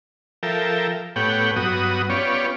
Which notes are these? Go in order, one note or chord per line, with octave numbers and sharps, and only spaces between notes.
F3 A4 A#4 E5 G5
A2 B3 G4 C#5 F#5 G5
G2 F#3 B3 F#4 D#6
B3 C#4 F4 G4 C#5 D5